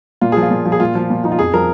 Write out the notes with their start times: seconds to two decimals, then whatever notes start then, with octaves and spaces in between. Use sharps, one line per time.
0.21 A#2 F4
0.32 F3 G#4
0.43 F4
0.51 A#2
0.65 F3
0.72 G#4
0.80 A#2 F4
0.95 F3
1.10 A#2
1.24 F3 D#4
1.32 F4
1.39 F2 G#4
1.54 F3 A#4